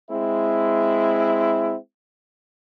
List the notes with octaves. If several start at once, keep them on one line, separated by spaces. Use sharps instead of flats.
G#3 C4 E4